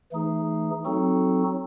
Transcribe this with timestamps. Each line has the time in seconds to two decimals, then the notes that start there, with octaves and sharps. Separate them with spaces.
0.12 E3 A3 D#4 G#4
0.85 F#3 C4 D#4 F#4 A4